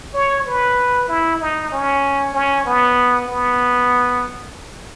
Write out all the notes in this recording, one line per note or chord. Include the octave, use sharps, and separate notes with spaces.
C#5
B4
E4
D#4
C#4
C#4
B3
B3